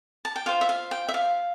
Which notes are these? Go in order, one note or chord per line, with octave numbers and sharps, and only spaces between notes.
A5
G5
F4 C5 F5
E5
F5
G5
E5
F5